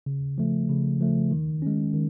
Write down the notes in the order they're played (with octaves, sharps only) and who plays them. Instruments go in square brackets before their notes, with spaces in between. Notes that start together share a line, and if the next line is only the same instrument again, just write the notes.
[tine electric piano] C#3
F3 A3
C#3
F3 A3
D#3
G#3 C#4
D#3